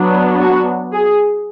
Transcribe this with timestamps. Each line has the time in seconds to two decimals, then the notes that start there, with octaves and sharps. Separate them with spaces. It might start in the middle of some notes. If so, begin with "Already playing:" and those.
Already playing: F#3 B3 D4
0.40 F#4
0.93 G#4